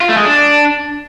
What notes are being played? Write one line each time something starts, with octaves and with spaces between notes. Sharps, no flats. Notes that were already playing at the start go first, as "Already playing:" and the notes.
F4
A3
G#3
D4